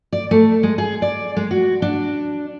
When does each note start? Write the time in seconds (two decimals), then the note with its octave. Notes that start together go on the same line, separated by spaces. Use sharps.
0.12 D5
0.31 A3
0.63 G#3
0.78 G#4
1.02 D5
1.37 G#3
1.51 F#4
1.82 D4